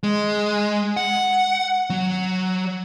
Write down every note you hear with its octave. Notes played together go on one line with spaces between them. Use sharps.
G#3
F#5
F#3